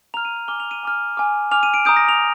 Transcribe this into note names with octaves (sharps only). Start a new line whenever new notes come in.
A#5 F6 F7
D#7
F7
G#5 D6 F6 G7
F7
D#7
G#5 D6 F6
G#5 D6 F6
G#5 D6 F6 F7
D#7
D7
A#5 D#6 G6 D7
A#6
F7